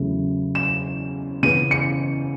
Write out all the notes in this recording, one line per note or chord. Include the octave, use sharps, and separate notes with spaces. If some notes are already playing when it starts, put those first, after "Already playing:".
Already playing: E2 C#3 F#3 A3 E4
E7
C#3 E3 B3 D#7
C#7